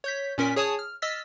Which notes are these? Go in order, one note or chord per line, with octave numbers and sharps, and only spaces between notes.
C#5 G6 B6
A#2 C#4 A#4 B6
G#4 C#5 G#5 A5 D#6
F6
D#5 E6 F6 A6 B6